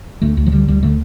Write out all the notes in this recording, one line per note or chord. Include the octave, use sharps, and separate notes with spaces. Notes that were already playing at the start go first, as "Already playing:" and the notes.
D2 A3
D2 A3
F3
D3 G3
D2 G3
D3 A3